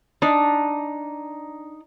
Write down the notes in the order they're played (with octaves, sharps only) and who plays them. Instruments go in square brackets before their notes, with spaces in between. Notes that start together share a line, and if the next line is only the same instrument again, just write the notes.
[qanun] D4 [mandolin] D#4